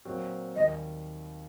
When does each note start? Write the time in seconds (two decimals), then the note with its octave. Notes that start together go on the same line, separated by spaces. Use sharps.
0.05 A#2 F#3 C4 F#4
0.56 D#2 D#3 G3 D#5